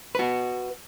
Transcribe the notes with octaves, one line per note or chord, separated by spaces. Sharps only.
F#4 B4